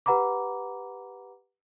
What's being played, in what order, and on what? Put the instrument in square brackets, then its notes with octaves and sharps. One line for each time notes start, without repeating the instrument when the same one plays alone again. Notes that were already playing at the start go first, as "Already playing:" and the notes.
[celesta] G4 B4 F#5 A#5 B5 D6